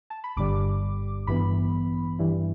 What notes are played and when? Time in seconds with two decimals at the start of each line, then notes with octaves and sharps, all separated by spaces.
0.10 A5
0.24 B5
0.36 G1 G2 D3 G3 D6
1.27 A1 G2 E3 B3 B5
2.19 G2 E3 G3 E4